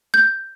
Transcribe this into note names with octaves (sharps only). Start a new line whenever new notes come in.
G6